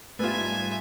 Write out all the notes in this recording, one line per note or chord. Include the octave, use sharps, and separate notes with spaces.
G#2 G3 A3 B3 F4 E5 G#5